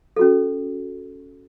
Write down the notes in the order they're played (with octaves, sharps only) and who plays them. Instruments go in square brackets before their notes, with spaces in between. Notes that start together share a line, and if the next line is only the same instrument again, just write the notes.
[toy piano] C#4 F#4 A4